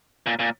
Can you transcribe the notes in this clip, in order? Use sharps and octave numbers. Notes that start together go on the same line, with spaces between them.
A#2
A#2